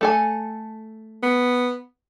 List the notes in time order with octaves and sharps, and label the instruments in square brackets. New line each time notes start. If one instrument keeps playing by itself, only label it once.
[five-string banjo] A3 A4 G#5
[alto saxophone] B3